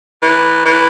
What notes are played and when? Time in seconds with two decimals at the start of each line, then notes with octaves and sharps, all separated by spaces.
0.22 E3
0.65 E3